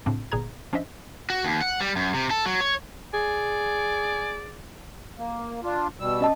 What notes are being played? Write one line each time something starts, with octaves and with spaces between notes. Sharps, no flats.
A2 C#3 C4 D4
G1 A#2 G#4 B4 A#5 G#6
F3 C#4 D4 C5 D#5 E5
F#4
D#2
F#5
G3
F#2
C3
A4
F#3
C#5
G#4 D5 G#5
A#3
D4 F4
B2 G3 E6
C#4 D#5 A5